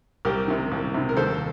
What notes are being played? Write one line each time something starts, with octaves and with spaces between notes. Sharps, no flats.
C2 G4 A#4
C3 D#3
C2
C3 D#3
A#4
D#2 A4 C5